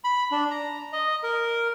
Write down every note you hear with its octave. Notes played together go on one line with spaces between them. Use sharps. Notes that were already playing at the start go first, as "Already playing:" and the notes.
B5
D4
A#5
D#5
A#4